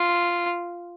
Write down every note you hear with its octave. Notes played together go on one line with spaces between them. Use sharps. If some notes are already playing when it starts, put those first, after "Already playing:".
Already playing: F4